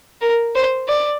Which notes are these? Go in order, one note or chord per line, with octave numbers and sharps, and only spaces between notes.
A#4
C5
D5